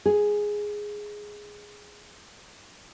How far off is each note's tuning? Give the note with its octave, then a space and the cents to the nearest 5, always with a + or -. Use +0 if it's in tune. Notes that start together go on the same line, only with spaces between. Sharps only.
G#4 +0